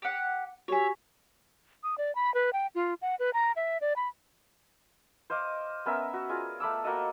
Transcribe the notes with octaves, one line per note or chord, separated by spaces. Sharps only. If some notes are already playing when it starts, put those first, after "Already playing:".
G4 F#5
F#4 G4 C#5 E5 G#5
D#6
D5
B5
B4
G5
F4
F#5
B4
A#5
E5
D5
B5
C5 D#5 F5 D6
B3 C#4 A#4 E5
F#4
F4 G#4 D5 F5
A3 B5 D6 E6
A#3 F#4 A4 D#5